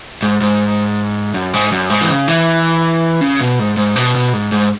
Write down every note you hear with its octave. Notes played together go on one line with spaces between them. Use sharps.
G#2
G#2
F#2
G#2
F#2
G#2
E3
C#3
E3
C#3
B2
G#2
G#2
B2
B2
G#2
G#2